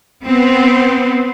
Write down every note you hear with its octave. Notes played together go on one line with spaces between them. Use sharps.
B3 C4